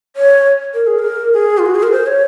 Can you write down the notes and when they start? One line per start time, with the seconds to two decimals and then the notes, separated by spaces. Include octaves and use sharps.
0.16 C#5
0.74 A#4
0.87 G#4
0.99 A#4
1.33 G#4
1.58 F4
1.66 F#4
1.75 G#4
1.83 A#4
1.92 C5
2.07 C#5